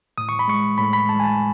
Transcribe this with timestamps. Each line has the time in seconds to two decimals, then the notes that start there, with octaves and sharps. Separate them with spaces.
0.18 A2 D#6
0.29 C#6
0.39 B5
0.48 G#3 C#6
0.78 A2 B5
0.93 B5
1.09 G#3 A5
1.20 G#5
1.23 A5